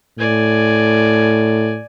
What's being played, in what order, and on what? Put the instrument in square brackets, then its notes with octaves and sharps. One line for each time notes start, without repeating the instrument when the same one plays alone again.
[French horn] A2 [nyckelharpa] D5 G#5